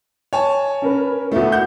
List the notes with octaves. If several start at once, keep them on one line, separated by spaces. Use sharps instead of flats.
C#5 G#5 A5
C#4 A#4 B4
D2 A3 B3 E4
F#5 G6